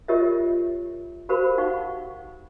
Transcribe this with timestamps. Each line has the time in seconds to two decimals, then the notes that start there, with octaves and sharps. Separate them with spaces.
0.08 F4 G4 A#4 C#5 D#5 E5
1.29 F#4 G4 A#4 C5 F5 B5
1.58 D#4 F5 F#5 C#6